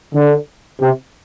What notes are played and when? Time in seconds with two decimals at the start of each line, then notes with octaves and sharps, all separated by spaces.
0.15 D3
0.81 C3